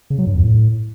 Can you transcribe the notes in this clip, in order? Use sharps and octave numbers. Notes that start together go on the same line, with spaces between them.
C#3
F#3
G2
E2
A2